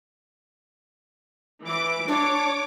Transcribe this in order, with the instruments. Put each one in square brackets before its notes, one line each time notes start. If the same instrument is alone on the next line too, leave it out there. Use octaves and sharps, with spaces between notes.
[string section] E3 D6
[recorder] D4 [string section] C#5 D6